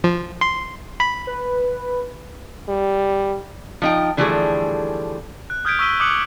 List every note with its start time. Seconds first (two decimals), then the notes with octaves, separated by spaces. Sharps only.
0.04 F3
0.41 C6
1.00 B5
1.27 B4
2.68 G3
3.82 F3 D#4 G5
4.17 D3 E3 F3 G3 A3 G#4
5.50 F#6
5.65 D#6 F6 G6 G#6 B6 D7
5.79 C#6 E6 B6 D#7 G7
6.00 D6 D#6 F6 F#6 C#7 F#7